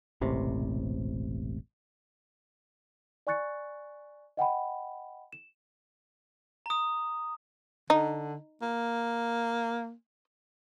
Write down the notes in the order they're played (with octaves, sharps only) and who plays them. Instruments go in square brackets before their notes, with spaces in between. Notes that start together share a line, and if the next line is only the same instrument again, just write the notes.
[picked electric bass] E1 A1 C3
[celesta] D5 G#5 C#6 F#6 A6 C#7
D#5 F#5 G5 B5
E7
[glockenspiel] A#5 D#6
[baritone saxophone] D3 [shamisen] D#4
[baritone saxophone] A#3